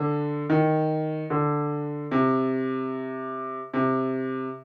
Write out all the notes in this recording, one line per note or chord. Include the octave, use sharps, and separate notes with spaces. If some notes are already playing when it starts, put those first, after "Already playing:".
Already playing: D3
D#3
D3
C3
C3